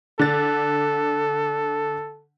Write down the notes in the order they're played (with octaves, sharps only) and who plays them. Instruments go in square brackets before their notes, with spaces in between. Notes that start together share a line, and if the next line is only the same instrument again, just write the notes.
[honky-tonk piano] D3 A6 [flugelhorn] A4